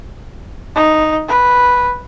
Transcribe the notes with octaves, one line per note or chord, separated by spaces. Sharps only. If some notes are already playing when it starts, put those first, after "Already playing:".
D#4
B4